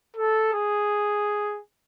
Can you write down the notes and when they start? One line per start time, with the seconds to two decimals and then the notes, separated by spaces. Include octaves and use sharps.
0.16 A4
0.53 G#4